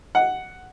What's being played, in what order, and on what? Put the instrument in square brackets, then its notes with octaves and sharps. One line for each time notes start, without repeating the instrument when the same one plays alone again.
[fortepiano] F#5